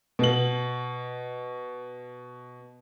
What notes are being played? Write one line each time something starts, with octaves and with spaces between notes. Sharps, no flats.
B2 F#7